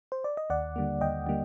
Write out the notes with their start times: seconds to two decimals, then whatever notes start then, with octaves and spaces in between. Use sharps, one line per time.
0.12 C5
0.24 D5
0.37 D#5
0.50 D#2 D5 F#5
0.76 D3 G3 A#3
1.01 D#2 D#5 G5
1.27 D3 G3 A#3